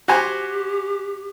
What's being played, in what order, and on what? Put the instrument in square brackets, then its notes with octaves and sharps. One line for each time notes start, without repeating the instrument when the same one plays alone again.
[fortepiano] F#4 C5 G#5 [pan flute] G4